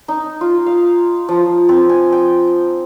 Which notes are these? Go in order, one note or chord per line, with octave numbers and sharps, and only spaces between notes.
D#4
F4
F5
F3
C4
G#5
G5